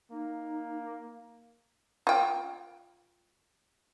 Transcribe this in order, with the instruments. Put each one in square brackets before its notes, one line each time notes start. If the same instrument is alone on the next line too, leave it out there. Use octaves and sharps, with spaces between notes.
[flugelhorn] A#3 [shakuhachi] D#4
[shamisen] F4 G5